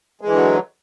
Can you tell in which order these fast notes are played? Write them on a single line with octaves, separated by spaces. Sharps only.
G#3 E3 D3 F#3